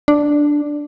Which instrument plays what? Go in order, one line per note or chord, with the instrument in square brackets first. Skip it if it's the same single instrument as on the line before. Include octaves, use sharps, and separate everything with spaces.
[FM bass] D4